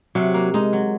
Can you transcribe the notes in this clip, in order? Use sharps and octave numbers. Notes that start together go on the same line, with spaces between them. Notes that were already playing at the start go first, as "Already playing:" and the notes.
C3 F#3
A#3
G#3 D#4
F#3